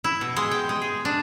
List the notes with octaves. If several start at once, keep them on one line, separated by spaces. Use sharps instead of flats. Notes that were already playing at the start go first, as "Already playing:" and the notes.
E4
B2
G#3
G5
G#3
G#4
D4